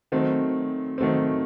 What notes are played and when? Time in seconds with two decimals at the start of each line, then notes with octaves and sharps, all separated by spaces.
0.12 D#3 F#3 A3 C4
0.98 D#3 F#3 A3 C4